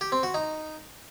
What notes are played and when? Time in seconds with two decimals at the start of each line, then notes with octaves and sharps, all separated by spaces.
0.01 G4
0.12 C4
0.23 F#4
0.34 D#4